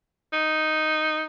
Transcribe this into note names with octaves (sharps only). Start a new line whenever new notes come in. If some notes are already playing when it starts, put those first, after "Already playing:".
D#4